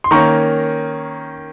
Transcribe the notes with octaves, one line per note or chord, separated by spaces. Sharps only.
C6
D#3 A#3 C#4 A#5 C#6